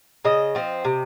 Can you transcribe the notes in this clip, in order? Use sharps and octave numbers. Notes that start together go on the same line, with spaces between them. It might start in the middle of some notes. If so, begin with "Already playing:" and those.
C#3 D#5
F3 C4
C3